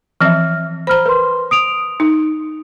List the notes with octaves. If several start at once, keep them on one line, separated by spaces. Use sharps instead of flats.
E3 F3 C4 E5 F6
C5 A#5 B5 F6
A#4 B4 C6
D#6 D7 F7
D#4